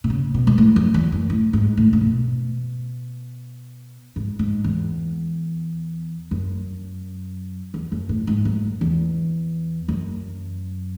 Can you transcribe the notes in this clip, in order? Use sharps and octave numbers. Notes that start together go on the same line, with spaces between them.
B2
C#3
B2
G#2
A2
F#2
E2
F#2
A2
G#2
A2
A2
B2
G#2
G#2
E2
F#2
E2
F#2
A2
G#2
F#2
E2
F#2